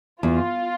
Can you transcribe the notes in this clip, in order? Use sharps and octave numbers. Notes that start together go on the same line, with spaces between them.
E2 F4